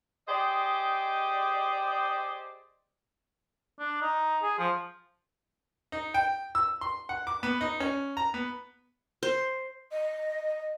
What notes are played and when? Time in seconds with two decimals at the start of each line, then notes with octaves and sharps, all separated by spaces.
0.28 G4 G#4 C5 D5 D#5
3.79 D4
4.01 D#4
4.43 G#4
4.59 F3
5.92 D#4
6.14 G5
6.55 E6
6.81 C6
7.09 F#5
7.27 D6
7.43 B3
7.61 D#4
7.80 C#4
8.17 A#5
8.34 B3
9.23 C5
9.90 D#5